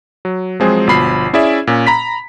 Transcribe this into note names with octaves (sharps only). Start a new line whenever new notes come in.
F#3
F3 F#3 G#3 C4 G#4 C5
G1 B2 F3 B5 C7
C#4 E4 G#4 D5 E5
A#2 C#4
A#5 B5 B6